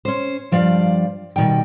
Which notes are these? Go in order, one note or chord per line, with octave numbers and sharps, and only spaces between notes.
C#4 C5
G2 F3 G3 D5 F5
B2 D#3 G3 G5